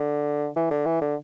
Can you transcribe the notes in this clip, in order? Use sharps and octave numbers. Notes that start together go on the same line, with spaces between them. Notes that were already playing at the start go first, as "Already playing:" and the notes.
Already playing: D3
E3
D3
E3
D3